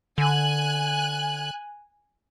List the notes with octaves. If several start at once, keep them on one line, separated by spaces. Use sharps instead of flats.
D3 G#5 F#6